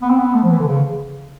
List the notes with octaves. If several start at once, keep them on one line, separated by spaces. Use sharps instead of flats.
B3
C4
B3
A3
F3
E3
D3
C#3